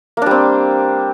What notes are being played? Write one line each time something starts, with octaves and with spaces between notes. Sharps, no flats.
G3 A#3 C4 D4